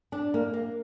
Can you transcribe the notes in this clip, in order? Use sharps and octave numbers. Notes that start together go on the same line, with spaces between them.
D4
A#3
A#3